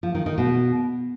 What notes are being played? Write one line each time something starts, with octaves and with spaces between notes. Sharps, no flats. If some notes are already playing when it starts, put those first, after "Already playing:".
F3
D#3
D#3
B2